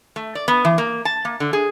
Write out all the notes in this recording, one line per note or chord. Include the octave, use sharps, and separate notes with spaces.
A3
D5
B3
E3
A#3
A5
A#3
D3
G#4